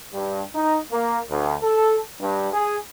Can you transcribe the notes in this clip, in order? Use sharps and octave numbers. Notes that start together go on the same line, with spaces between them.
G2
D#4
A#3
D2
A4
G2
G#4